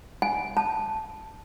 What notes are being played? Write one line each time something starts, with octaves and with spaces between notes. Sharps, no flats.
G#5
A5